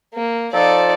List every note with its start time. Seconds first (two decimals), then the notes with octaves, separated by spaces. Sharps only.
0.14 A#3
0.53 F3 D#4 A4 D5